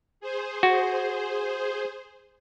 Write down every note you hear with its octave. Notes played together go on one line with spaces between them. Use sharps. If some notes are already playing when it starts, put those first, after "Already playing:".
G#4 C5
F#4